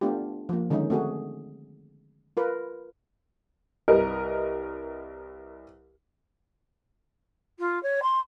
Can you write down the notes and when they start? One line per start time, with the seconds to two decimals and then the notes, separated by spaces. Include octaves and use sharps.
0.01 A3 B3 D4 F4 G4
0.49 F3 A#3
0.70 D3 D#3 G#3 C#4 D#4
0.90 A3 C4 F#4 G#4
2.37 F4 A#4 B4
3.88 C2 A#4 B4 D#5 F6
7.58 F4
7.82 C#5
8.02 C6